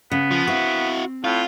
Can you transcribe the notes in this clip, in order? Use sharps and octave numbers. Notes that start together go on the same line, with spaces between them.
C#3 B3
F3
C4 E4 F#4
A2 F4